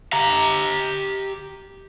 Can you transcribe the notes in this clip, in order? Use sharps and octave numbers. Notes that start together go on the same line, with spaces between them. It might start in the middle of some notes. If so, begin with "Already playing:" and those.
G4 A#5